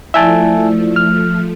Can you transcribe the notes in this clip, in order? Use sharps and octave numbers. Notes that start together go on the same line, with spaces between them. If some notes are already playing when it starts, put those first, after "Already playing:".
F3 A3 E4 D5 E5 G#5 A5
F6